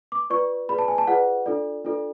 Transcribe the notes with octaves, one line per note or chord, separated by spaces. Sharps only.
D6
F4 B4 D5 C#6
F4 G#4 B4 D5 B5
A5
G#5
A5
F4 G#4 B4 D5 F#5
D4 F4 A4 D5
D4 F4 A4 D5